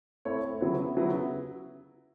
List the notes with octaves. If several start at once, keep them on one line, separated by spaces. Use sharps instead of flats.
A3 C4 E4 A4 C#5
C#3 F#3 B3 E4
C#3 F#3 B3 E4